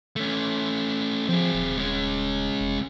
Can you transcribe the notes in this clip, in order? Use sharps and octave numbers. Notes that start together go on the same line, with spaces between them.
A3 C#4
F3 C4 G#4
D#1
G#3 C#4
F1